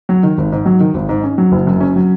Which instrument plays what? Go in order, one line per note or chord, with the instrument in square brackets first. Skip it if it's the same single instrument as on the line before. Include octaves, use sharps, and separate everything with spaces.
[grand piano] F#3
D#3
G#1
G#2
F#3
D#3
G#1
G#2
C#4
F#3
F#1
F#2
C#4
F#3